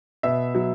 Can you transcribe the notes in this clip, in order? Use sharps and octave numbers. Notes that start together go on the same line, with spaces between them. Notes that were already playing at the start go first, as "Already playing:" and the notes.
B2 E5
F#3